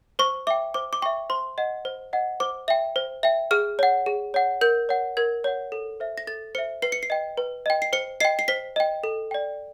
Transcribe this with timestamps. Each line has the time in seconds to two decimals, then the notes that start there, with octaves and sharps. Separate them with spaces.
0.19 C5 C#6
0.47 E5 G5 D6
0.74 C5 D6
0.93 D6
1.02 E5 G5 C#6
1.30 C5 C6
1.58 D#5 F#5
1.85 C5
2.13 D#5 F#5
2.40 C5 D6
2.68 E5 G5
2.96 C5
3.23 E5 G5
3.51 G#4 F6
3.79 C#5 F#5
4.06 G#4
4.34 C#5 F#5
4.61 A#4 G6
4.89 C#5 F#5
5.17 A#4 G#6
5.44 C#5 F#5
5.72 A4
6.00 C5 E5
6.18 A#6
6.27 A4 A6
6.55 C5 E5 C#7
6.82 B4 C7
6.92 C#7
7.03 C7
7.10 D#5 G5
7.37 B4
7.66 D#5 G5
7.82 C7
7.93 C5 C#7
8.20 D#5 G5 C7
8.39 C7
8.48 C5 B6
8.76 D#5 G5
9.04 A4
9.31 D5 G5